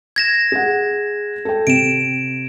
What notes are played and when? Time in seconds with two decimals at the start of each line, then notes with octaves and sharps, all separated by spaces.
0.16 G#6 A#6 E7
0.52 G#4 F#5
1.45 A4 G5
1.67 C3 D7 E7